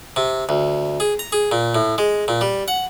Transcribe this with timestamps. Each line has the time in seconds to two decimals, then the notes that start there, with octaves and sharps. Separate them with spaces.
0.16 C3
0.49 D2
1.00 G#4
1.19 A#5
1.32 G#4
1.52 A#2
1.75 A2
1.98 G#3
2.28 A#2
2.41 G3
2.68 F#5